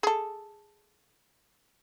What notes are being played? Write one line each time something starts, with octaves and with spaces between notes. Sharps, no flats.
G#4 A4